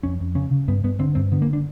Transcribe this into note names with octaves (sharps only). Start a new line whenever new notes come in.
F2 C#4
F2
C#3 C#4
C#3
G2 B3
G2 B3
D3 C4
G2 C4
D3 B3
A#3
D4